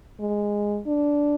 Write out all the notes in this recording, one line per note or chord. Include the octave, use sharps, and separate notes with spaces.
G#3
D4